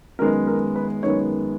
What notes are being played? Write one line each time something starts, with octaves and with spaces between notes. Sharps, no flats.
F#2 D#3 G#3 B3 A#4
A#4
B4
F#2 D#3 G#3 B3 C#5